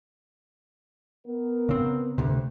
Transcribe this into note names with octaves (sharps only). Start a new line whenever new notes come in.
B3 A#4
C#3 C4
D2 C3